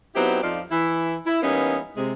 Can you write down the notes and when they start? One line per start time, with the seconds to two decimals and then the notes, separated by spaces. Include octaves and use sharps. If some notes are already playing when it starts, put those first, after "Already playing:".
0.16 F#3 B3 C4 D#4 E4 G4
0.42 F2 F3 D#4 F4 D5 F5
0.71 E3 E4
1.26 E4
1.42 E3 G3 A#3 B3 C#4 D#4
1.97 C3 G#3